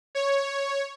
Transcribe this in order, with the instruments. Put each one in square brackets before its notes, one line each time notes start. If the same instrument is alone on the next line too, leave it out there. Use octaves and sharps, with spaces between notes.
[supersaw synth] C#5